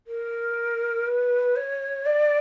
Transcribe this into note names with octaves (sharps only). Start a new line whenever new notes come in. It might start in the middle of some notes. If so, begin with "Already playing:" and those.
A#4
B4
C#5
D5